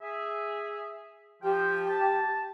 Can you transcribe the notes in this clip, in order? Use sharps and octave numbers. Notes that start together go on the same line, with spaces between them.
G#4 E5
F3 G4 G5
A5